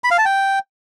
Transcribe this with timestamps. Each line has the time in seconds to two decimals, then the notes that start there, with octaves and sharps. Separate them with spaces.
0.04 B5
0.11 F5
0.18 A5
0.25 G5